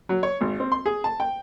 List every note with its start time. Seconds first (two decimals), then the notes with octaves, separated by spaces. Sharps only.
0.09 F#3
0.23 C#5
0.41 G#1
0.60 C4
0.72 C6
0.86 G#4
1.04 A5
1.20 G5